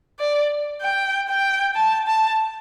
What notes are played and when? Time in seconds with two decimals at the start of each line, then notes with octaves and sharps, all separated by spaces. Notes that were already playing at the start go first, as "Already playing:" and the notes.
0.19 D5
0.82 G5
1.28 G5
1.75 A5
2.07 A5